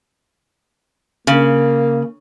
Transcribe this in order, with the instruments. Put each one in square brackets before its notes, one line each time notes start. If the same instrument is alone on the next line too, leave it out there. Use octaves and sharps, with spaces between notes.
[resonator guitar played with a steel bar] C#3 [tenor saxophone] A#3